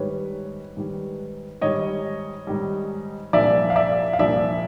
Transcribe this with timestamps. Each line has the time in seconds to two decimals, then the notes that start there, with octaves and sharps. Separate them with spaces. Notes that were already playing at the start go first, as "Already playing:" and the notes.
Already playing: G#2 D#3 G3 B4 C#5
0.77 G#2 D#3 G3
1.61 G#2 D#3 G3 C#5 D#5
2.47 G#2 D#3 G3
3.33 C2 A#2 F3 D5 E5
3.70 F5
3.76 D5 E5
4.13 F5
4.19 C2 A#2 F3 D5 E5